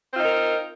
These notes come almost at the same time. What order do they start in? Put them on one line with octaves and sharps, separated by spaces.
C4 F4 D#4 A#4